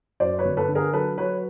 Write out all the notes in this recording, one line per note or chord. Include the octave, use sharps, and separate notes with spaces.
F#2 C5 D5
B4 C#5
G1
A4 B4
D3
G#4 A#4
F#3 A4 B4
F#3 B4 C#5